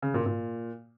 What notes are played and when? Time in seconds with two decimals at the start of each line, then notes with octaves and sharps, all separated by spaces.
0.02 C#3
0.14 A#2
0.26 A#2